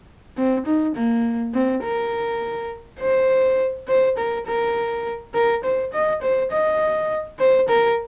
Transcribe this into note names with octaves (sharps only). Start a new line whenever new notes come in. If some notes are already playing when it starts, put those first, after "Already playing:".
C4
D#4
A#3
C4
A#4
C5
C5
A#4
A#4
A#4
C5
D#5
C5
D#5
C5
A#4